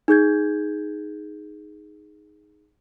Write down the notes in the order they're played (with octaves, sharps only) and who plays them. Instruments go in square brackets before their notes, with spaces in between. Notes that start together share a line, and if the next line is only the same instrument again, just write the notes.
[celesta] D#4 G#4 G6 G#6